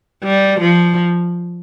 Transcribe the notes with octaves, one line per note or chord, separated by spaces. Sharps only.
G3
F3